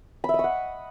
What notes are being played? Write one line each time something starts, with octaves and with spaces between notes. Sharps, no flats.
B5
E5
D#5
C#6
F#5